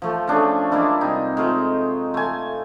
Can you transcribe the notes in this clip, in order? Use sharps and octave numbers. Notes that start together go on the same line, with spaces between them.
F3 A3
A3 C#4 D4 G#4
G#3 A#3 D4 E4
C3 G3 D#4
G#3 A3 F4 C5
A3 G#5